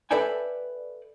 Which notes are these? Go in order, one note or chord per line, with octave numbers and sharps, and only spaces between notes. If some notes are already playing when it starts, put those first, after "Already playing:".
A4 B4 D5 E5 G5 G#5